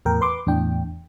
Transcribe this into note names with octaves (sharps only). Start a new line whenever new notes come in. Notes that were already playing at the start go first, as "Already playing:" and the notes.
E2 A2 A#4 G5
B4 C6 D6
E2 A2 D4 G5